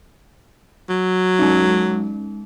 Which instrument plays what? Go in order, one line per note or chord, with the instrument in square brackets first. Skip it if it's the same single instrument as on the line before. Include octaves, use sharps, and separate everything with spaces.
[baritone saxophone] F#3
[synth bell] G#3 C#4 D#4